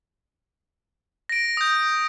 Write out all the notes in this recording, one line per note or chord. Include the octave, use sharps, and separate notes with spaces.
A#6 D7
D#6 G6